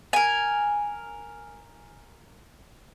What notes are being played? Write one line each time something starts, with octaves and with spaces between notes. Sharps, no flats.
A#4 G#5